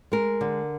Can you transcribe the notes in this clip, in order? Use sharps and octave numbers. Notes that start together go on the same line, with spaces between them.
G#3 A#4
D3